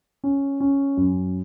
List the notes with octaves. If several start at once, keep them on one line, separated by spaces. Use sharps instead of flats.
C#4
C#4
F#2